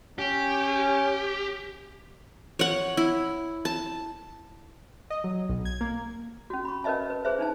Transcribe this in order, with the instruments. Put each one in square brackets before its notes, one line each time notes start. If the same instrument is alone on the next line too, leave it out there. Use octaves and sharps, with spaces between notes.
[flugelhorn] C#4 [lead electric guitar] G4
[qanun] C#5 F#5
E4
A5
[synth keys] D#5
F#3
B1
G#6
A#3
[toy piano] C#4 F#4
B5 C#6
C#4 A#4 B4 D#5 E5 A5
B4
G#4 B4 C5 E5
D4 D#4 A5